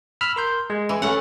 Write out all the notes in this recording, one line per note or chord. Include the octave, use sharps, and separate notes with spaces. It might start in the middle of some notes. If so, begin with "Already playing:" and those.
B5 E6 F6
A#4 C6 G6
G#3
E3
A3 C#4 F#5